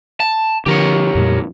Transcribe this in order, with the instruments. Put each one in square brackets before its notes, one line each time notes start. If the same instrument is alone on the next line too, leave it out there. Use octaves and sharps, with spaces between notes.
[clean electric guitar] A5
[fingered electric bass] D3 F3 [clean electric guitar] G4 A#4 C#5
[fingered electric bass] F2 A#2 G3